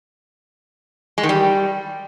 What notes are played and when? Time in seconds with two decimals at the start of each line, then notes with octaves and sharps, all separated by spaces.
1.18 G#3
1.23 D#3
1.29 G3